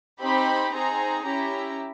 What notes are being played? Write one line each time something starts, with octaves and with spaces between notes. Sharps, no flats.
C4 D#4 G4 B5
C4 D#4 G#4 A#5
C#4 E4 G4 A#5